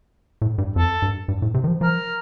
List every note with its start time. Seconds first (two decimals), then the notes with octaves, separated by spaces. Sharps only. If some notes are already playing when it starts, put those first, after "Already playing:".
0.42 A2
0.58 G2
0.76 F2 A4
1.02 G2
1.28 G2
1.42 A2
1.54 C3
1.64 D#3
1.67 F3
1.81 F3 A#4